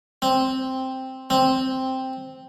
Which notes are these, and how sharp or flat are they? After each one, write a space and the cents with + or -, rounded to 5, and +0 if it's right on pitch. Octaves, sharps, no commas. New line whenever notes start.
C4 +0
C4 +0